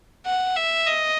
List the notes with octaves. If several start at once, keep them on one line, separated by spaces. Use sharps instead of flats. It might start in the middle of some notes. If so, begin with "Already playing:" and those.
F#5
E5
D#5